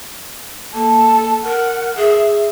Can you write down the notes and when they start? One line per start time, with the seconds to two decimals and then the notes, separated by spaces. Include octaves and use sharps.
0.74 A#3 A4
1.43 A#4 F#5
1.96 G#4 E5